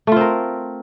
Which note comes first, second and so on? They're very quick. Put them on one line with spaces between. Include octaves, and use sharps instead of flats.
A3 F4 C4 A#4